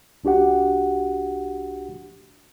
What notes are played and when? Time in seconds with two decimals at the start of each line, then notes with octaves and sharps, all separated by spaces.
0.24 C2 D4 F#4 G4 F#5